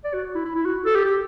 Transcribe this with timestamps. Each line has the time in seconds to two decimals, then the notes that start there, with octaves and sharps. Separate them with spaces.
0.04 D5
0.14 F#4
0.35 E4
0.45 E4
0.55 E4
0.66 F#4
0.86 A4
0.96 G4
1.06 G4